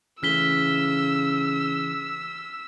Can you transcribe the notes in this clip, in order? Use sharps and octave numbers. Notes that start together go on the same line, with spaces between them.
C#3 E3 A3 E6 F6 B6 G7